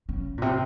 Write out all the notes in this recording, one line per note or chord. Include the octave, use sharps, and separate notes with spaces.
C#3
A#2
C3